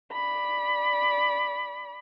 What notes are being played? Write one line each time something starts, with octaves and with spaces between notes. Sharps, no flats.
D5 B5